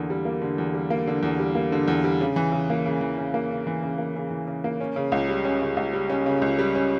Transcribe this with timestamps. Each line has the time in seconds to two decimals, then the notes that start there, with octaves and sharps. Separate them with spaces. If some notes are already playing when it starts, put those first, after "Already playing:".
Already playing: E2 D3 A#3
0.10 G3
0.25 A#3
0.42 D3
0.58 E2
0.74 G3
0.90 A#3
1.07 D3
1.23 E2
1.39 G3
1.55 A#3
1.72 D3
1.88 E2
2.04 G3
2.21 C#3
2.36 E3
2.52 C#3
2.70 A#3
2.86 C#3
3.01 E3
3.18 C#3
3.34 A#3
3.50 C#3
3.67 E3
3.82 C#3
3.98 A#3
4.16 C#3
4.31 E3
4.47 C#3
4.64 A#3
4.81 C#4
4.96 C#3
5.12 C#2
5.29 G3
5.45 C#4
5.61 C#3
5.77 C#2
5.94 G3
6.10 C#4
6.26 C#3
6.42 C#2
6.59 G3
6.75 C#4